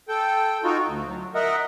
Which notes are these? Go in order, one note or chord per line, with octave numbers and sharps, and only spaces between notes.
A4 G5
D#4 F4 F#4
D2
F#3
A#4 D#5 E5 F#5